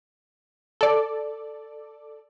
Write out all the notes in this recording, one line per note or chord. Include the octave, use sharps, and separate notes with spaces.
A4 D5